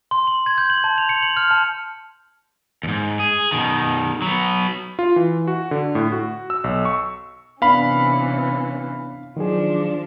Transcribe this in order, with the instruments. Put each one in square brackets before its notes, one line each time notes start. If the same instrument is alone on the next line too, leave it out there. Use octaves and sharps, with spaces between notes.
[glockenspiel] C6
F#7
G#6
G6
F#7
A5
F7
C#7
F#7
F6
A5
[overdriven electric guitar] D#2 G#2
G#4
B2 D#3
F#3 B3
[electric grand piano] F4
E3
F#4
D3
A2
F#4
E6
B1
C#6
[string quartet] C3 E3 C#4 [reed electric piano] B3 D4 [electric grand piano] F5 B5
[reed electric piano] D#3 F#3 G#4 [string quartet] F3 D4